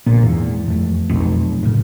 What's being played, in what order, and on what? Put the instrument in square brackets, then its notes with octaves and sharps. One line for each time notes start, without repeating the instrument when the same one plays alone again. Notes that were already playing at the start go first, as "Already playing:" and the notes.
[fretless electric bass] A#1 A#2 [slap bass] B3
[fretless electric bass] E2 [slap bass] G#2
[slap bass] F2 A3
[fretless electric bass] F1 B1
[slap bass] A2 C#3